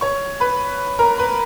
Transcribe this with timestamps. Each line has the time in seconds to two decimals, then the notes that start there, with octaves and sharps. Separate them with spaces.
0.01 C#5 C#6
0.40 B4 B5
0.99 A#4 A#5
1.18 B4 B5